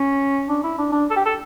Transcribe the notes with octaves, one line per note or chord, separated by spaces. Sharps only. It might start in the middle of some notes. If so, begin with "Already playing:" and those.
Already playing: C#4
D4
E4
D4
D4
A4
G4
A4